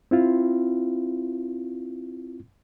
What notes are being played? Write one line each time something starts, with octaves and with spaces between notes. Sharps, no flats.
C4 E4 F4